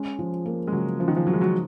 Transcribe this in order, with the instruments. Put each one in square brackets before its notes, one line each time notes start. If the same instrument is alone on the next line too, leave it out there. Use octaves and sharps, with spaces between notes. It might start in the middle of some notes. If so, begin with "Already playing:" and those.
Already playing: [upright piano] G#3 [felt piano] C#4
[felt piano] F3
A#3
[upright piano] G#3
[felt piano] C#3 [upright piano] F#3
[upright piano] F3 [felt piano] C#4
[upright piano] D#3
F3
[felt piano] F3 [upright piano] F#3
[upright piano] G#3
F#3